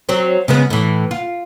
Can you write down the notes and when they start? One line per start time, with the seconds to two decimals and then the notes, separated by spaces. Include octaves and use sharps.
0.09 F#3 C4
0.48 C#3 G#3 B3
0.70 A2 E3
1.11 F4